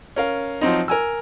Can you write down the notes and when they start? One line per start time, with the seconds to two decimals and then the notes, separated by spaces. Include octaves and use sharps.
0.16 C#4 A#4 F5
0.61 F3 F#3 C4 D#4
0.88 A#4 G#5 E6